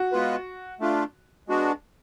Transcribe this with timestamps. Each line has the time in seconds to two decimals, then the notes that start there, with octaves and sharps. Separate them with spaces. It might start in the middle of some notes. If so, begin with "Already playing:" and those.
Already playing: F#4
0.12 G#3 B3 F4 B4
0.80 A3 D4 F4
1.48 G#3 B3 D4 F#4